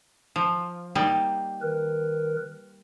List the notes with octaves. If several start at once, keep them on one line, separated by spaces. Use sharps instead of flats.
F3
G3 A#3 D#4
D#3 A#4 B4